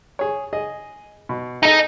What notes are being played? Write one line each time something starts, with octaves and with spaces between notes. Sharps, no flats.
G#4 C#5
G#4 D#5
B2
D#4 G#4 A4 D#5